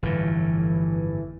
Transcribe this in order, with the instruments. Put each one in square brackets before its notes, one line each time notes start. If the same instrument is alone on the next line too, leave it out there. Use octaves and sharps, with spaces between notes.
[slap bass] G1 F2 A2 [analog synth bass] E3